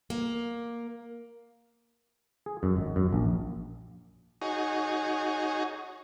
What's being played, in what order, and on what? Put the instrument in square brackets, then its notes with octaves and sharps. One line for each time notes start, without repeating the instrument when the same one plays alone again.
[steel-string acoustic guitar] A#3
[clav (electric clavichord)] G#4
F#2
G#1
F#2
A#1
[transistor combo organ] D#4 F#4 G#4 C#5